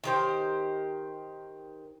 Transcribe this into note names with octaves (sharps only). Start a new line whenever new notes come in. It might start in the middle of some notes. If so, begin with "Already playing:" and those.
D#3 G4 C5